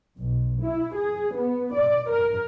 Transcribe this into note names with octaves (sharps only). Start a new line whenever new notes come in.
B1
E4
G#4
B3
D5
A#4